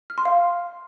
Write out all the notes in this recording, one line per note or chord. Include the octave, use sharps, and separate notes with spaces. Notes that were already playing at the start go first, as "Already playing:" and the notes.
F6
C6
F5